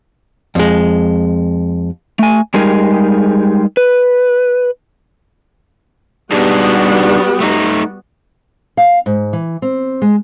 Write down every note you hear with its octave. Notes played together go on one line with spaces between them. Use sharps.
F2 G#3
A3 G#5
G3 G#3 D#4 G4 G#4 A#4
B4
G3 B3 D4 D#4 F#4 G#4
A3 D#4
F5
G#2
E3
C4
G#3